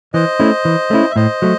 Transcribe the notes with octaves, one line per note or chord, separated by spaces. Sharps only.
E3 C5 D#5
A3 C#4 E4
E3
A3 C#4 E4
E5
A2 C5 D#5
F#3 A3